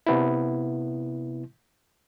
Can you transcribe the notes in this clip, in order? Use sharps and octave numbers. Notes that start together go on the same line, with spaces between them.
C3 B3 E4